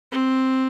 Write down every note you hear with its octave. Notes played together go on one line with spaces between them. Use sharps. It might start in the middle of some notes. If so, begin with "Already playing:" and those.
C4